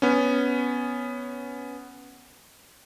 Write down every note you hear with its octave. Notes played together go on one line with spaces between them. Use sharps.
B3 C#4